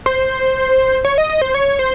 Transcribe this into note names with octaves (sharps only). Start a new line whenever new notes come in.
C5
C#5
D#5
D#5
C5
C#5
C5